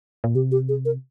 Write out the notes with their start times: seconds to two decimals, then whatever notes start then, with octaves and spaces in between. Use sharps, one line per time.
0.24 A#2
0.35 C3 G4
0.51 G4
0.69 G#4
0.85 A#4